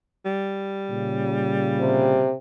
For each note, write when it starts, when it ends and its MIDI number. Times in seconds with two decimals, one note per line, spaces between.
0.25 2.25 55
0.89 2.31 46
0.89 2.31 49
1.80 2.33 48